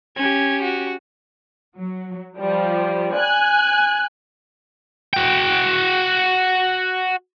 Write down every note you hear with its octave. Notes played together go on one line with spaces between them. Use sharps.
C#4 G4 G#6
F#4
F#3
F3 G3
G#5 F#6
F#4 G5